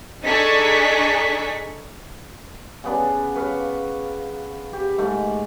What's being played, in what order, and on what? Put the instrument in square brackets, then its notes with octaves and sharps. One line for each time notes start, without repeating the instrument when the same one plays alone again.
[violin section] D4 D#4 G#4 A4 C#6 B6
[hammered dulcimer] C#3 B3 D4
B4 C#5 F5
G4
G#2 A3